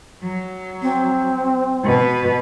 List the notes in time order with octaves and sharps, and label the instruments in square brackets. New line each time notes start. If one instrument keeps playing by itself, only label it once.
[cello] F#3
[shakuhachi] C4
[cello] B2 B4